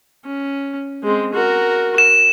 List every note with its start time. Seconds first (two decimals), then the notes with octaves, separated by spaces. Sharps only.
0.25 C#4
1.03 G#3 C4
1.34 F#4 A#4
1.98 E7